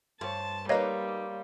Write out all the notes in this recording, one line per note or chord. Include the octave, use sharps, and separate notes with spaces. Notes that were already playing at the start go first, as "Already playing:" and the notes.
G2 C5 C#5 A5
G3 A#3 D#4 B4 C#5 D#5 F5